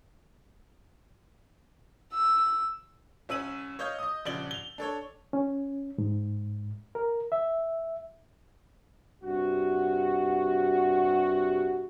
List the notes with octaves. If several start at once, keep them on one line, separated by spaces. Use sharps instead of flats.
E6
C2 C#4 E6 D#7 F#7
C#5 D#5 F5 G6
D#5 D#6
D#1 A#1 C#3 D5 F#7 G7
F7 G7
D4 A4 C#5
C#4
G#2
A#4
E5
G2 C3 F#4